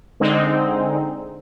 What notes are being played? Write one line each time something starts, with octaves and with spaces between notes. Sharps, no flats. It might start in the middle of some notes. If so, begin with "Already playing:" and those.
D3 G#3 C4 D#4